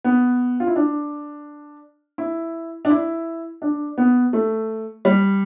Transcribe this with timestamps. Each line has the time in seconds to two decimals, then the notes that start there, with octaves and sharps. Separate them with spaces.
0.04 B3
0.60 F4
0.67 E4
0.76 D4
2.18 E4
2.85 D4
2.90 E4
3.62 D4
3.98 B3
4.33 A3
5.05 G3